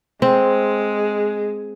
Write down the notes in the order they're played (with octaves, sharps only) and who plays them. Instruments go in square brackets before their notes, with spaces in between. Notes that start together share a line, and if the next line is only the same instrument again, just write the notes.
[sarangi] G#3 [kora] C4